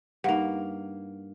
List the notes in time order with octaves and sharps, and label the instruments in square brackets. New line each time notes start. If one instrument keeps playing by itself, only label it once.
[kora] G2 A#3 [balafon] D#4 F5 F#5